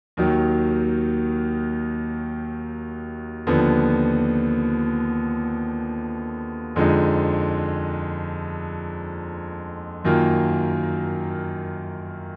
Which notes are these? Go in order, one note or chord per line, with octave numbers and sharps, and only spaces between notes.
D#2 D#3 F#3
D#2 D3 F3 B3
F2 D3 F3 G#3 D#4
F#2 D#3 A#3 F4